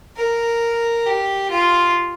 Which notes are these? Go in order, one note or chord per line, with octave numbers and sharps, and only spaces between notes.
A#4
G4
F4